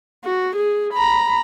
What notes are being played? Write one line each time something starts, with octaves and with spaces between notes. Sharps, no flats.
F#4
G#4
A#5 B5